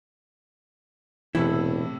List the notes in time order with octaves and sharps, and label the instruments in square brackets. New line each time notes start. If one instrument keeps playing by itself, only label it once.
[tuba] E1 [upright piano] A2 C3 A4 [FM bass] E3 [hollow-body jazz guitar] E4